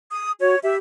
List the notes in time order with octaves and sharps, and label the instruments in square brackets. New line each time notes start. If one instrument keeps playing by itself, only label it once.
[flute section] D#6
[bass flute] F#4 [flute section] C#5
[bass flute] G4 [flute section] E5